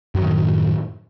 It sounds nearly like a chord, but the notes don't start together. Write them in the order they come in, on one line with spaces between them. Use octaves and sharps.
F#2 F#3 D#3 A2